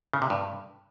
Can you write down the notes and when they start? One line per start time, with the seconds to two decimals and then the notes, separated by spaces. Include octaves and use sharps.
0.13 C#3
0.22 C3
0.30 G2